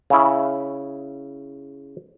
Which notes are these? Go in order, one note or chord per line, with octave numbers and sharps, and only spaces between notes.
C#3 E4